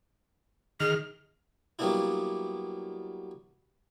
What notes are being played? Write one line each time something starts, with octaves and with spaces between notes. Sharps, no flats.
D#3 G#4 F6
F#3 G3 A#3 B3 D4 E4